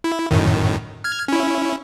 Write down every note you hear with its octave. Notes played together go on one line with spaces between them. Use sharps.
E4
F#2 A2 D#3
F6 G#6
C#4 E4